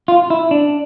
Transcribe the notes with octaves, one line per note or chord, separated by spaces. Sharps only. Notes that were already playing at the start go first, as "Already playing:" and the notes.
F4
E4
D4